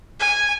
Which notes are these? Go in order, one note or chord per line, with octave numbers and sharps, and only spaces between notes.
G#5